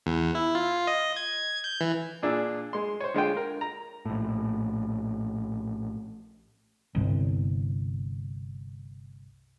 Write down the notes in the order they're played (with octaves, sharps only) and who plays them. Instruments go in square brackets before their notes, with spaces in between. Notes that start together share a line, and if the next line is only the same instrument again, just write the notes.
[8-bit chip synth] E2
E4
F4
D#5
G#6
G6
E3
[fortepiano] A#2 D4 G#4 E6
G#3 C6
C5 C#5
D3 G#3 F4 G5
A#4
A#5
[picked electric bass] A#1 A2
[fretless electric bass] G1 C2